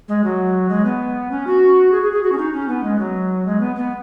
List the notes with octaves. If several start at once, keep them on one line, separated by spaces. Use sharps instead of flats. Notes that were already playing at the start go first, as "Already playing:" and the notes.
G#3
F#3
G#3
B3
C#4
F#4
G#4
G#4
G#4
F#4
C#4
D#4
C#4
B3
G#3
F#3
G#3
B3
B3